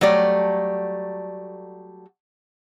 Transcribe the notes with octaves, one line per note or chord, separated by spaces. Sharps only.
F#3 G3 A3 D5